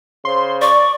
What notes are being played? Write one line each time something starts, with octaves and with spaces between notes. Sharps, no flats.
C#3 C5 C6
D5 C#6